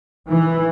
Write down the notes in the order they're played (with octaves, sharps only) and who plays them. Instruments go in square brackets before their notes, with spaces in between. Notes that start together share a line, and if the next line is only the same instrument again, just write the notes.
[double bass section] E3